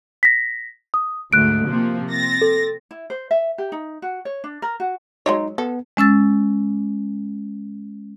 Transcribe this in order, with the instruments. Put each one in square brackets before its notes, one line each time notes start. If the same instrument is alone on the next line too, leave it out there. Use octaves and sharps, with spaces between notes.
[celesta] A#6 B6
D#6
[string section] D2 G#2 A3 [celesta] F#6 D7
[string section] C3 F3 A#3
C4 A6 A#6
[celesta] A4
[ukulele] E4
C5
E5
G4
D#4
F#4
C#5
D4
A#4
F#4
[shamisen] F#3 G#3 C#5 [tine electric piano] D#4
[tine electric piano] B3 [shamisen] A4
[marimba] G#3 C#4 E6 A6